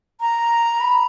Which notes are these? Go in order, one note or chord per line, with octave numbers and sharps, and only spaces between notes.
A#5
B5